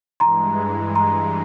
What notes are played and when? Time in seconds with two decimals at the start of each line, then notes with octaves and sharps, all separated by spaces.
0.20 G2 E3 G#3 A#5 C6
0.95 A#5 C6